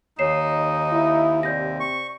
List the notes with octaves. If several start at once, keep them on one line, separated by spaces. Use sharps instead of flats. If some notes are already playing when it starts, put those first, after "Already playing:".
D#2 D#4 C#5 C7 E7
E4
C3 D5 G6 A#6
C#6